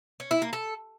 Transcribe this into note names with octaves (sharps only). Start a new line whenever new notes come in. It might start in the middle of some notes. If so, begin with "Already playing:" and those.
C#4
E4
A#3
A4